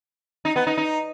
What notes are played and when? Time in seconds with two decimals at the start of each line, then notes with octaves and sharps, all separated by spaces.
0.45 D#4
0.56 B3
0.67 D#4
0.77 D#4